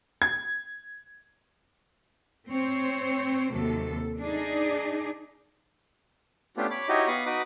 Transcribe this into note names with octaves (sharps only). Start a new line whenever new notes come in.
G#6
C4 C5 C#5
D#2 C3 F#3 A4
D4 D#4 G#4 D5
A3 B3 C#4 D4 F4 G4
C#5 B5 D6
D#4 E4 F#4 G4 C#5 D#5
B3 F5 B5 C#6 D#6
D#4 F#4 B4 B5 D6 D#6